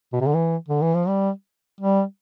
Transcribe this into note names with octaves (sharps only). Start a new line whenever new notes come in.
B2
C3
D3
E3
D3
E3
F3
G3
G3